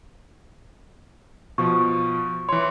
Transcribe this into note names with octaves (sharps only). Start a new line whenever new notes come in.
B2 F3 C#6
E3 C#5 C6